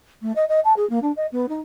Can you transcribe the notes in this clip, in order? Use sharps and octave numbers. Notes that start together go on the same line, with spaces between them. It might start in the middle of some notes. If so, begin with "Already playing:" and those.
A3
D#5
D#5
A5
G#4
A#3
D4
D#5
B3
D#4